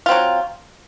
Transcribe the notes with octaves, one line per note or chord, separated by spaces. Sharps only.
F#3 C4 F4